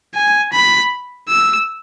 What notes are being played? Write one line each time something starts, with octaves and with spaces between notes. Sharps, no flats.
G#5
B5
E6